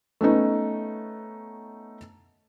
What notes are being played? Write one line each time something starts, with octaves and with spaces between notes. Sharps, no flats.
A3 B3 C#4 D#4